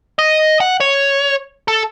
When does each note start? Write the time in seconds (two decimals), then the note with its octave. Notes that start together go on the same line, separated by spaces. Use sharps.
0.19 D#5
0.60 F#5
0.80 C#5
1.68 A4